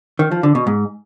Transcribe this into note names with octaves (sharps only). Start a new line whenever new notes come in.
D#3
F3
D3
B2
G#2